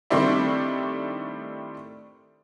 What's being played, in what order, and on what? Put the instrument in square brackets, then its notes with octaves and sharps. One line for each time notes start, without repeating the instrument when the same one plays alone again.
[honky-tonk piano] D#3 G3 A3 C4 D4 E4